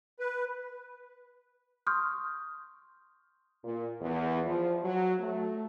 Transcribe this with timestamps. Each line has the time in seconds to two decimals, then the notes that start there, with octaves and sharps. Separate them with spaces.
0.20 B4
1.87 C6 C#6 D#6 F6 G6
3.63 A#2
4.00 E2
4.45 F3
4.83 F#3
5.19 A3